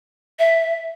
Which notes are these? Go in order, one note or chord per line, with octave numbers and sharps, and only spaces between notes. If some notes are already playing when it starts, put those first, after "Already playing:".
E5